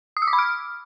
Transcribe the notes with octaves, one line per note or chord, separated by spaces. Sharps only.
D#6
E6
D6
B5
F6